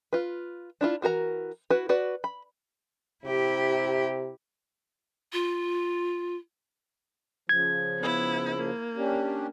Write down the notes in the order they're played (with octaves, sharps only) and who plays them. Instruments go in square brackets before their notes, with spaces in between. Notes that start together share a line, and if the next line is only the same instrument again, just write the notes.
[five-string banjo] F4 B4
D4 E4 F4
E3 F#4 A#4 A#5
E4 F#4 B4
F#4 B4 D5
B5
[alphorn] C3 [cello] E4 G4
[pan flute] F4
[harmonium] C#3 F3 [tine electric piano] G#6
[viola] B3 E4
A#3
[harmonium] C#4 D4 G4